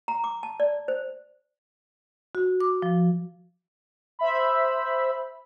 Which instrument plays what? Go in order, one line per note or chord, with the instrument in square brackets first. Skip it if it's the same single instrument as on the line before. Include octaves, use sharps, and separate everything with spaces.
[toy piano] A#5
D6
A5
D5
C5
[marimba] F#4
D6
F3
[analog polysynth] C5 E5 B5